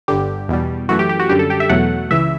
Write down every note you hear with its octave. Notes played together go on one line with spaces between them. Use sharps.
G1 G2 D3 G4
E2 B2 G3
F#2 E3 A3 F#4
G4
G4
F#4
F#2 D3 G3 G4
A4
G4
E5
E2 B2 F#3 A3 F#5
C#2 C#3 E3 E5